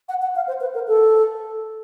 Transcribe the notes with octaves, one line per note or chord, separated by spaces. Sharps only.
F#5
F#5
F5
C5
B4
A#4
A4